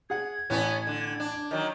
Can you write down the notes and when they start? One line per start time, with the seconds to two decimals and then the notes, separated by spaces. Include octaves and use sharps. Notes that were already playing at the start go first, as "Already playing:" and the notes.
0.10 G#4 F#5 G#6
0.50 A1 B3 C#4 G#5
0.87 D3
1.20 D4
1.51 D#3 F#3